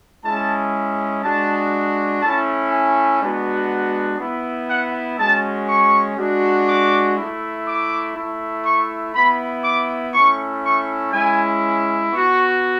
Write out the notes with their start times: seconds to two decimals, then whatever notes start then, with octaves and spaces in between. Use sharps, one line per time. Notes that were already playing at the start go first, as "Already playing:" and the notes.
0.23 G#3 C#4 E4 A5
1.23 G#3 D4 F#4 A5
2.21 A3 C#4 E4 A5
2.71 G#5
3.21 G#3 B3 D4 F#4
4.20 B3 E4
4.69 F#5
5.18 G#3 C#4 F#4 A5
5.68 C#6
6.18 G#3 D4 F#4
6.67 D6
7.17 A3 E4
7.66 D6
8.16 A3 E4
8.65 C#6
9.15 B3 E4 B5
9.64 D6
10.13 A3 C#4 E4 C#6
10.63 C#6
11.12 G#3 C#4 E4 G#5
12.11 B3 F#4 C#6